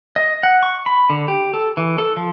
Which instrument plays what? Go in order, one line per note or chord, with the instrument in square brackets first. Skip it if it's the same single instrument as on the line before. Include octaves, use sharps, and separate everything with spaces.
[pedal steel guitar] D#5
F#5
C#6
B5
D3
G4
A4
E3
A4
F3